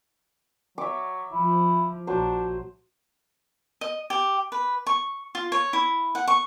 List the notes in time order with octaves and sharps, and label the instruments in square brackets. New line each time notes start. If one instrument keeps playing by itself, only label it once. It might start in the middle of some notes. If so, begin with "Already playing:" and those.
[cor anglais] F#3 [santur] E5 D6
[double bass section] F3 [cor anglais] E4
[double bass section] A#1 [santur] F#3 C5 [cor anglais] D4
[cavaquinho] D#5
G4
B4
C#6
F4
C#5
E4
F#5
C#6